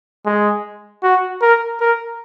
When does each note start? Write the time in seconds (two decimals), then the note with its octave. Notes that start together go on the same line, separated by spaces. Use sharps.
0.26 G#3
1.03 F#4
1.42 A#4
1.80 A#4